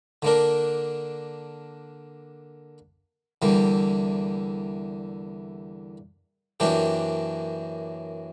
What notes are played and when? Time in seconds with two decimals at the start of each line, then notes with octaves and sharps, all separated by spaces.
0.22 D3 A#3 D4 A#4
3.42 E2 D3 G3 A#3
6.60 F#2 E3 A#3 D4 G4